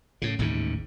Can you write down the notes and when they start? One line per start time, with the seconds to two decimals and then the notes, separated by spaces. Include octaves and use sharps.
0.22 A2 C#3
0.39 A1 D#2 G#2 C3